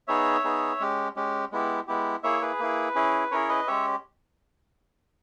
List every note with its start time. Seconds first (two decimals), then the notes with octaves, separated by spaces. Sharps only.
0.08 B3 D#4 G#4 C#5 E5
0.44 B3 D#4 G#4
0.80 G#3 C#4 G4
1.16 G#3 C#4 G4
1.52 G#3 B3 E4 G4
1.87 G#3 B3 E4 G4
2.23 A#3 E4 G#4 C#5 E5
2.41 G#4 B4
2.60 A#3 E4 G#4
2.95 C#4 E4 G#4
3.31 C#4 E4 G#4 A#4 C#5
3.49 B4 D#5
3.67 G#3 C#4 G4 C#5 E5